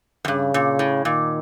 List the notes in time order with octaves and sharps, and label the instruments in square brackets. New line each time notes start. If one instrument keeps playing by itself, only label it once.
[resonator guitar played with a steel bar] F#2
[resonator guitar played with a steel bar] G2 [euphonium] C#3
[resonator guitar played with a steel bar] A#2
A2
[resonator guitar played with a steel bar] A#2 [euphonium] D#3